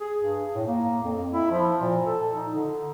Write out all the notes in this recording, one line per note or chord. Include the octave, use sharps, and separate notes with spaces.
G#4
G2
A2
A#3
F2
E4
F3
A#2
A4
D#4
D3